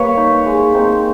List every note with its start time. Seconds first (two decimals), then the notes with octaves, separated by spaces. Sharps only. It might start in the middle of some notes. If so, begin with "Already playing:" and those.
Already playing: G3 A#3 B4 C#5
0.17 D#4
0.46 G#3
0.74 C4 D#4